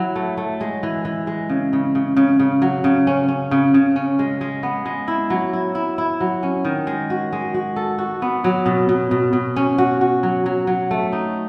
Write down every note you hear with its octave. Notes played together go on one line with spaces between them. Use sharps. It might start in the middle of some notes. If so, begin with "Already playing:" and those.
Already playing: F#3 E4
A3
A3
G#3
E3
E3
G#3
C#3
C#3
C#3
C#3
C#3
F#3
C#3
C#4
C#4
C#3
C#3
C#4
G#3
G#3
B3
G#3
E4
F#3
E4
E4
E4
F#3
C#4
D#3
G#3
F#4
G#3
F#4
A4
F#4
B3
F#3
B2
B2
B2
B2
C#4
F#4
F#4
F#3
F#3
F#3
A3
D#4